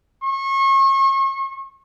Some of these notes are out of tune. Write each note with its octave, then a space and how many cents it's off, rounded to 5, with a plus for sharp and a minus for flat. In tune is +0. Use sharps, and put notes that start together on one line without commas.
C#6 -35